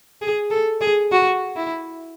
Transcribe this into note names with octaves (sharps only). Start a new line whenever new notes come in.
G#4
A4
G#4
F#4
E4